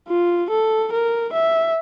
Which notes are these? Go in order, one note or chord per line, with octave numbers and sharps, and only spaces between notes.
F4
A4
A#4
E5